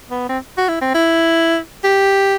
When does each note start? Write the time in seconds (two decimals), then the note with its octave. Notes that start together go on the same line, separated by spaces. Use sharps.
0.11 B3
0.29 C4
0.58 F#4
0.69 E4
0.82 C4
0.94 E4
1.84 G4